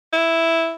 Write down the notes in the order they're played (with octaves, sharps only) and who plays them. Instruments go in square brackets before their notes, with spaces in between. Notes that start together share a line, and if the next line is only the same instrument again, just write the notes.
[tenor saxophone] E4